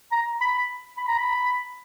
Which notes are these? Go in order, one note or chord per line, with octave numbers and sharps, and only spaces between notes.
A#5
B5
B5
A#5
B5